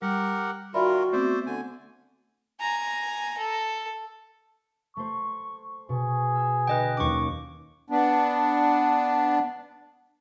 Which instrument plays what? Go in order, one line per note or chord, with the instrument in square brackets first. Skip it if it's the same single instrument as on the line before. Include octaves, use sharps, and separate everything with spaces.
[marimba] G3 [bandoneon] G4 A#4 F#5
[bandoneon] D#3 F4 A#4 [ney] F#4 [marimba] D5 E5 B5
[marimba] A3 B3 C4 [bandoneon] C5 D5 E5
[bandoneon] D3 G#5
[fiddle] G#5 A#5
A4
[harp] A3 C5 [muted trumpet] C#6
[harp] B2 C#6 [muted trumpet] G#4
[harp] G5 G#5 E6
[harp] D3 [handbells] B4 D#5 G5
[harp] D#2 F#3 C#4 [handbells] C#6 D6
[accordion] B3 D4